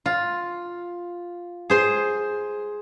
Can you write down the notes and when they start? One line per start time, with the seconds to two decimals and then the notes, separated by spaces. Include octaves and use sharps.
0.06 F4
1.70 G#4 C5 C6